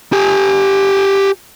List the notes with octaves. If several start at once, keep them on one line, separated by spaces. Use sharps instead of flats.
G4 G#5